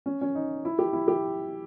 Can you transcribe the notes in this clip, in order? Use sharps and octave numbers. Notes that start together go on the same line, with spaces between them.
C#4
C#4
D#4
E4
G4
E4
G4